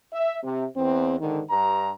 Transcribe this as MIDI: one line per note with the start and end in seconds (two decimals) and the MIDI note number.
0.13 0.38 76
0.43 0.65 48
0.77 1.17 40
0.77 1.17 60
1.20 1.42 44
1.20 1.42 50
1.20 1.42 51
1.51 1.90 43
1.51 1.90 82